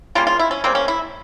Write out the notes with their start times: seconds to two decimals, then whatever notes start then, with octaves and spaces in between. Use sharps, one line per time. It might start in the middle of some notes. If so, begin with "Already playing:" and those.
0.15 C#3 G3 A#3 F4
0.27 F4
0.39 E4
0.51 C#4
0.64 C#3 G3 A#3 C4
0.75 C#4
0.88 E4